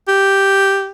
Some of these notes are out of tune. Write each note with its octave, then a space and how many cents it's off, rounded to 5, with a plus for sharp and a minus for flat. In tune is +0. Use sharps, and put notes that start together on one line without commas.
G4 +0